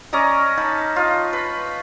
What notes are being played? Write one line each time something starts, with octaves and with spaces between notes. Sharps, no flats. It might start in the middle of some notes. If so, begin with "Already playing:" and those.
C#4 D5 D#5 A#5
D#4 A5 B5
F4 D#5
B4